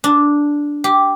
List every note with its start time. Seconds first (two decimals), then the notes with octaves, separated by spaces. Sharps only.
0.04 D4
0.84 G4